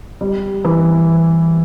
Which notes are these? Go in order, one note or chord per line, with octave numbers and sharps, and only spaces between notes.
G3
E3